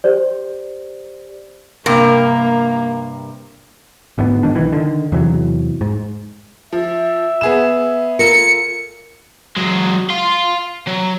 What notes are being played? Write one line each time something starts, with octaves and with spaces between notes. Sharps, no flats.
G4 C5 D5
G2 C3 A#3 A#4
G#1 D2 G#2 B3
G1 G#2 D#3 D4
B1 D#3 E3
D3 D#3
E2 C3 E3 F#3
G#2
F3 E5
B3 G#4 E7
F4 A4 A#4 C#7
F#3 G#3
F5 C6
F#3